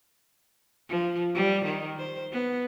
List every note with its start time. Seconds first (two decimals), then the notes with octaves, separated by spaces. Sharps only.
0.89 F3
1.35 G3
1.65 D#3
1.97 C5
2.32 B3